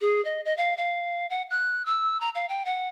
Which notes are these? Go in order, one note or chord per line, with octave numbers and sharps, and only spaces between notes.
G#4
D#5
D#5
F5
F5
F#5
F#6
E6
A#5
F5
G5
F#5